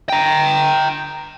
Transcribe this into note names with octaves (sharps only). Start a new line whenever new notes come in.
G5 A#5